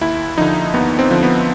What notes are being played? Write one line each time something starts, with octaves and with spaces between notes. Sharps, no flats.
D#2 E4
D3 F3 D#4
D#2 B3
C4
D3 F3
B3